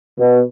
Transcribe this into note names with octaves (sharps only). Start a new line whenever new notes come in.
B2